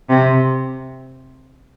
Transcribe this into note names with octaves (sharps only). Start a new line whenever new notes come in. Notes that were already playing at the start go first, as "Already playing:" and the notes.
C3